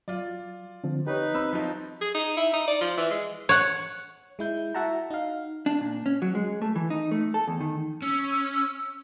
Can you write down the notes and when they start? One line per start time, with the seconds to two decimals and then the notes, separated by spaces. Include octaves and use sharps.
0.08 F#3 F4 D5
0.84 D3 F3 C4
1.07 D#4 G4 B4 C#5
1.35 C4 B5 E6
1.53 F3 F#3 D#4
2.01 G#4
2.15 D#4
2.37 E4
2.53 D#4
2.67 D5
2.81 F3
2.97 E3
3.10 G#3
3.49 C#5 F#5
4.39 G#3 E4 G6
4.74 E4 F#4 E5 F#5 A5 A#5
5.10 D#4 F5
5.66 D4
5.81 A#2
6.06 C#4
6.22 F#3
6.35 G#3
6.62 A3
6.76 E3
6.90 D#4
7.11 A3
7.34 A4
7.48 E2
7.61 D#3
8.02 C#4 E6